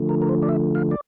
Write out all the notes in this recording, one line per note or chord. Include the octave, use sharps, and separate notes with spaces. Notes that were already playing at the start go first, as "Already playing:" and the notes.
Already playing: D3 F3 A3
A#4
A#4
C5
D5
E5
F5
D5